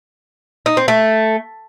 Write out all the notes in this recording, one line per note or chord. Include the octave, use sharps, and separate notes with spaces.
D#4
C4
A3